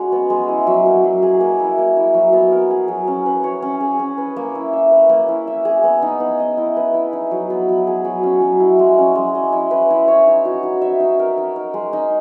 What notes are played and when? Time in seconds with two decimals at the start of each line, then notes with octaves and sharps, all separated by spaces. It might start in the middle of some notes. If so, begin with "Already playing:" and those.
Already playing: G#3 C#4 F#4
0.12 B3
0.30 G#3
0.48 E4
0.67 F#3
0.86 A#3
1.04 F#3
1.23 G#4
1.41 A#3
1.60 E4
1.78 A#3
1.96 E4
2.14 F#3
2.33 B3
2.52 A#4
2.71 G#4
2.88 F#3
3.07 C#4
3.26 B4
3.44 C#5
3.62 C#4
3.80 G#4
3.99 C#4
4.18 B4
4.36 A#3
4.55 E4
4.73 E5
4.91 B4
5.09 A#3
5.29 E4
5.47 E5
5.65 G#4
5.84 B3
6.02 D#4
6.20 B3
6.40 D#5
6.57 E4
6.77 B4
6.94 E4
7.13 D#4
7.31 F#3
7.50 B3
7.69 F#3
7.87 G#4
8.05 F#3
8.23 C#4
8.42 F#3
8.60 E4
8.79 G#3
8.98 C#4
9.15 G#3
9.35 D#5
9.52 E4
9.71 B4
9.90 E4
10.08 C#5
10.27 D#4
10.45 F#4
10.63 D#4
10.81 E5
11.00 D#4
11.19 A#4
11.38 D#4
11.56 A#4
11.74 G#3
11.93 D#4